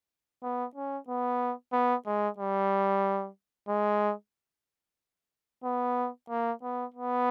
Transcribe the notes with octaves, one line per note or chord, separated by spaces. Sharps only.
B3
C#4
B3
B3
G#3
G3
G#3
B3
A#3
B3
B3